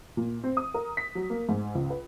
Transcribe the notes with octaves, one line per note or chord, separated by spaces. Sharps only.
A#2
C4
D#6
A#4
B6
F#3
A#3
G#2
C#2
B4